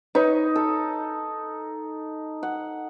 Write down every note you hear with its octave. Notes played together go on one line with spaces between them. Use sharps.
D#4 B4 C#5
A4
F#5